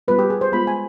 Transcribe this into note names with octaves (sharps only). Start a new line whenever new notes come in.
G3 B3 F4 B4
G4
G#4
C5
G#3 B3 F4 B5
G#5